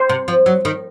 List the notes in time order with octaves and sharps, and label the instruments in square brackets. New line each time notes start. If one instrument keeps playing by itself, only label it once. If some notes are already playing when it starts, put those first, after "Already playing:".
Already playing: [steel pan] C5
[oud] C3
F3
F#3
D#3